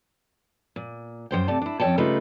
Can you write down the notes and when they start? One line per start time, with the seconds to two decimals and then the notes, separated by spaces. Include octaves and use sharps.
0.76 A#2
1.31 F#2 D#3 C5 G5
1.48 C3 A3 D5 A5
1.62 D4 E4
1.80 F2 C#4 C#5 D5 G5 A5
1.98 C#3 G3 A3 D#4 F4 B4